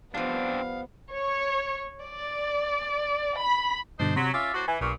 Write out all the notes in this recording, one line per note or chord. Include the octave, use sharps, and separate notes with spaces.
F3 G3 B3 C4 D4 F5
C#5
D5
B5
G2 B2 D3 D4 D#4 C5
C3 F#3 C6 B6
C#4 F4 E5 D6 A6
A2 F#4 C5
E3 G#5
B1 G2 A#2 C#6